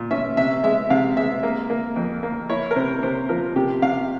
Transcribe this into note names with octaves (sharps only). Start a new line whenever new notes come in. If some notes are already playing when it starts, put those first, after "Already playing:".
Already playing: A#2
C#4 E5
C3 E5
G#3 E5
C3 F5
G#3 E5
A#3
A#3
F2
A#3
E4 C#5
A#4
C3 C5
C3 C5
F3 A#4
C3 G4
C3 F5